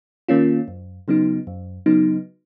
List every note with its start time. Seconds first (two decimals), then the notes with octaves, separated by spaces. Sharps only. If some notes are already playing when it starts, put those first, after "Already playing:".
0.29 D#3 A#3 C#4 F4
0.68 F#2
1.08 C#3 F#3 B3 D#4
1.47 F#2
1.86 C#3 F#3 B3 D#4